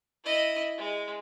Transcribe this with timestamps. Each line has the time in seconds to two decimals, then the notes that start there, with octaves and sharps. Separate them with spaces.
0.24 E4 D#5
0.78 G#3